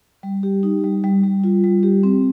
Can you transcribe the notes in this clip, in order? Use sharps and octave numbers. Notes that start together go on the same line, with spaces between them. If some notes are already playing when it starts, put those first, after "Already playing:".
G3
G4
D#4
G3
G3
G3
F4
G3
G4
C4